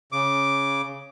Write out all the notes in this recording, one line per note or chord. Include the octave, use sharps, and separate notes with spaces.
C#3 D6